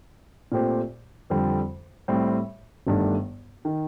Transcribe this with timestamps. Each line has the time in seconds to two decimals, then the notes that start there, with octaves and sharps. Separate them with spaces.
0.52 A#2 A3 C4 G4 C5
1.30 F2 D3 G3 C4
2.08 A2 G3 C4
2.87 G1 G2 D#3 A3 D4
3.65 D#3